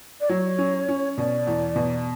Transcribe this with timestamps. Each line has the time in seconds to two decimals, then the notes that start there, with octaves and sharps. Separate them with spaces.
0.20 D5
0.29 F#3 C#5
0.58 C#4
0.88 C#4
1.17 B2 D5
1.47 E2
1.76 B2